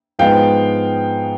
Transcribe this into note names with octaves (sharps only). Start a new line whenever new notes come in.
G#2 F3 G#3 B3 F5 G5